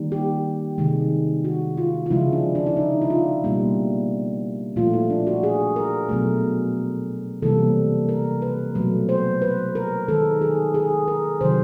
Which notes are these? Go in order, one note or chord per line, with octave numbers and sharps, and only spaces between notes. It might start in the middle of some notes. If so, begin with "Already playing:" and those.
Already playing: D#3 G3 A#3
G4
C3 D#3 G#3
F#4
F4
F4
C#3 F3 G#3 E4
D4
D4
E4
D#4
E4
F4
B2 G3 A#3
A#2 F3 A3 F4
E4
D4
F#4
G#4
A#4
B2 F#3 A3
C3 E3 G3 A#3 A4
A#4
B4
B2 F#3 A3
C5
B4
A#4
D#3 G#3 A4
G#4
G#4
A#4
C3 D#3 F#3 C5